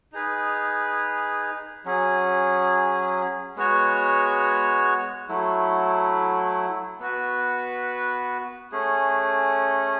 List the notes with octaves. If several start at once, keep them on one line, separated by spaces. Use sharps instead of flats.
D#4 G#4 B4
F#3 C#4 G#4
G#3 B3 F#4 C#5
F#3 A3 E4
B3 F#4 B4
A3 C#4 G#4